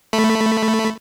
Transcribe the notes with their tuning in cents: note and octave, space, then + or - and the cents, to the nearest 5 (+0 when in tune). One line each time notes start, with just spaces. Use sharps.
A3 +5 B5 +0